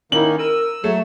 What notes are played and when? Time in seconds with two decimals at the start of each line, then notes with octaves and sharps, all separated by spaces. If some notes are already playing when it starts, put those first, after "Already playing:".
0.12 D#3 A#3 C#4 D#4 E4 F#7
0.39 A#4 E6 D#7
0.84 F#3 A3 C#5 E7